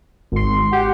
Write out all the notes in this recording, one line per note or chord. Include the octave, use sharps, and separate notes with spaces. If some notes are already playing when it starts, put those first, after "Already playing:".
G#1 C6
G4 F#5